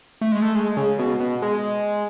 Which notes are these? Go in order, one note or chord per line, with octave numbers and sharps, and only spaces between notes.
A3
G#3
A3
G#3
C#3
B2
B2
G#3